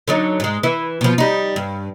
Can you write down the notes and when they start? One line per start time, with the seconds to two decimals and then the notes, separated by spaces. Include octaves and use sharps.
0.08 D3 F#3 D#4
0.40 G#2 G#3
0.63 E3 E4
1.01 B2 F3
1.18 G3 D#4
1.56 G2